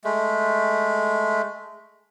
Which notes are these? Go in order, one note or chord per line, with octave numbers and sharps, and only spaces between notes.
G#3 A3